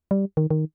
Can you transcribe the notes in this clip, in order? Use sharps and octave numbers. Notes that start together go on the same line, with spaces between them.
G3
D#3
D#3